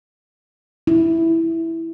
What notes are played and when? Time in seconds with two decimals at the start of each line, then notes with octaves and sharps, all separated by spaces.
0.87 E4